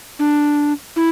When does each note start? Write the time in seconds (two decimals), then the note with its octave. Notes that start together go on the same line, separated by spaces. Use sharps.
0.19 D4
0.96 E4